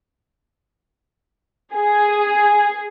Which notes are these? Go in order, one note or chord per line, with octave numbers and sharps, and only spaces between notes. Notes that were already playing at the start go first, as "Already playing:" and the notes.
G#4